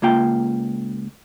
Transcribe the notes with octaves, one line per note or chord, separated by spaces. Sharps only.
C#2 A#3 F4 G5